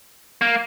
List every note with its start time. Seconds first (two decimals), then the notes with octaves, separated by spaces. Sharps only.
0.42 A#3